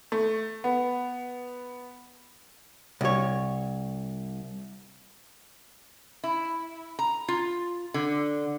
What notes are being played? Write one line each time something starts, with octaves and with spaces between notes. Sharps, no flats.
A3
B3
C2 C#5
E4
A#5
F4
D3